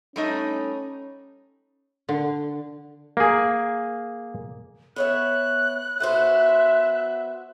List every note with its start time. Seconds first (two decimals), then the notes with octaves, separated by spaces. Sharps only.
0.16 G3 A3 C#4 D#4
2.09 D3
3.17 A#3 G#4
4.96 B3 C#5 E5 F#6
6.00 B3 F#4 C5 E5